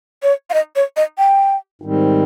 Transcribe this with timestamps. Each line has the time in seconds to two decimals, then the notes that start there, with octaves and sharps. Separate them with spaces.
0.23 C#5
0.50 F5
0.54 D#5
0.76 C#5
0.97 D#5
1.18 G5
1.82 G#2 D#3 G3 C4